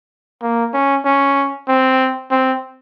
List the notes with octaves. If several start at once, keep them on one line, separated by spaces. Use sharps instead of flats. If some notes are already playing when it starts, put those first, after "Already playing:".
A#3
C#4
C#4
C4
C4